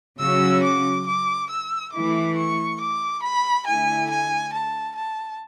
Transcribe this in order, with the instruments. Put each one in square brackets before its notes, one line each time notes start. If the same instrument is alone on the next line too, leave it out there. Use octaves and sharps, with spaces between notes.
[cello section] C#3 F#3 C#4 F#4 [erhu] E6
[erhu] D6
D6
E6
[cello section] E3 A3 E4 [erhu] D6
[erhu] C#6
D6
B5
[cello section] D3 A3 E4 [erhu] G#5
[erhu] G#5
A5
A5